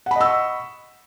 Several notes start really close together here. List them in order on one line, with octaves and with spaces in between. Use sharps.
F#5 B5 D#5 E6 C#6